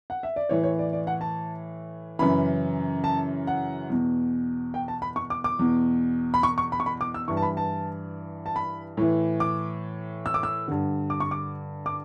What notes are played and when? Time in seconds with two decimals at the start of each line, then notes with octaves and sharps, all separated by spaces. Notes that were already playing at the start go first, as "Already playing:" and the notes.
0.10 F#5
0.23 E5
0.36 D5
0.49 A2 E3 C#5
0.64 C#5
0.79 D5
0.93 D5
1.07 F#5
1.21 A5
2.19 F#2 C#3 E3 B5
3.04 A5
3.47 F#5
3.90 E2 B2
4.74 G5
4.88 A5
5.02 B5
5.16 C#6
5.30 D6
5.44 D6
5.59 E2 B2
6.34 B5
6.43 C#6
6.58 C#6
6.72 B5
6.80 C#6
6.86 B5
7.01 D6
7.14 E6
7.28 G2 E3 C#6
7.37 A5
7.42 B5
7.57 A5
8.46 A5
8.56 B5
8.97 A2 E3
9.40 D6
10.26 E6
10.34 D6
10.43 E6
10.68 G2 D3
11.10 D6
11.20 C#6
11.31 D6
11.86 D6